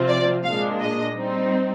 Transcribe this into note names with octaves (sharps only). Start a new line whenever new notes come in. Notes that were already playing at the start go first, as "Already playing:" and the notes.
Already playing: C3 F3 C4 F4
D5
A#2 G#3 D4 F5
D#5
G3 C4 D#4